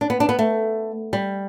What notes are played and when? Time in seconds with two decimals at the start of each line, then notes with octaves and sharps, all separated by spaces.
0.01 D4
0.10 B3
0.20 D4
0.29 B3
0.39 A3
1.13 G3